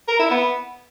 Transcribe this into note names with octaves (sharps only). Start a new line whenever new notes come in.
A#4
E4
B3